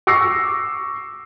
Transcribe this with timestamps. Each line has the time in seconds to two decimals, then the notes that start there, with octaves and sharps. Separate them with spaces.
0.07 C#6 D6 E6 A#6 C7